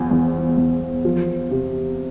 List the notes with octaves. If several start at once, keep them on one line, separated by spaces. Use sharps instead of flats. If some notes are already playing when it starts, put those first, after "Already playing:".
Already playing: E2 F3
E2
E2
F3
C3